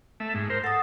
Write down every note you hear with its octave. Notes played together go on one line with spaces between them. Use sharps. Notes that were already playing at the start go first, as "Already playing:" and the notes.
A3 E5
G#2
A#4 C5
A4 F#5 D#6